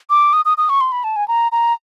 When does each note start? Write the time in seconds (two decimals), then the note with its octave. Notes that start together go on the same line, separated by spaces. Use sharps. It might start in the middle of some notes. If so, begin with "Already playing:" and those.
0.10 D6
0.33 D#6
0.45 D#6
0.58 D#6
0.69 C#6
0.81 C6
0.92 B5
1.04 A5
1.16 G#5
1.28 A#5
1.52 A#5